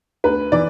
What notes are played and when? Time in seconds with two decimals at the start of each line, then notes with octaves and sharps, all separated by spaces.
0.24 D2 B4
0.52 E3 D5